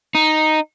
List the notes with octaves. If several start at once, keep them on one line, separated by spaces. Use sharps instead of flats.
D#4